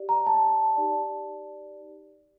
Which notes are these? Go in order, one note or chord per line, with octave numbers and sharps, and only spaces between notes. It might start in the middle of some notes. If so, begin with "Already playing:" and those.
Already playing: G4 D5
A#5
A5
D#4 G4 D5